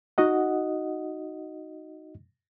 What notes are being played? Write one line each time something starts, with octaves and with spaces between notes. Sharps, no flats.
D#4 F#4 D#5 F#5